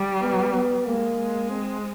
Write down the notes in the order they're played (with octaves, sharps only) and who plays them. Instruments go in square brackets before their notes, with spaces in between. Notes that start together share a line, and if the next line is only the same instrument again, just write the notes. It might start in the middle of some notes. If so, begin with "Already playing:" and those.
Already playing: [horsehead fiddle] G3
[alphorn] B3
B3
[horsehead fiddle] G#3 [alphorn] A#3
[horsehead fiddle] G#3
[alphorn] C4